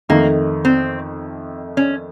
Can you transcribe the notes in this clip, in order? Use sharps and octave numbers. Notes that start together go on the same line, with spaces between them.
F2 D#3 A3 A#3
C4
C#4